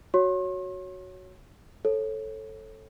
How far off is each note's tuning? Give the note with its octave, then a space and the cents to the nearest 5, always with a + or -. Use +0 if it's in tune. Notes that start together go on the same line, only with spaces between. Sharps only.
F#4 +0 C#5 +0 C6 +45
A4 +0 C#5 -30